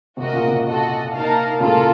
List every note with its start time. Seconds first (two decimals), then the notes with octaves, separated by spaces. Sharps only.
0.17 C3 F#4 A#4 D#5
0.33 A#2 C#3
0.48 C3
0.64 F#4 A4 D#5
1.12 A#3 D#4 A#4 F5 A5
1.60 A#2 C#3 A#3 F4 A4